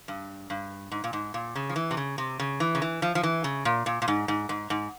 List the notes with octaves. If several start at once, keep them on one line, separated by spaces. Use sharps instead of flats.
G2
G2
G#2
A#2
G#2
A#2
C#3
F3
E3
C3
C#3
C3
C#3
E3
C#3
E3
F3
F3
E3
C#3
A#2
A#2
A#2
G#2
G#2
G#2
G#2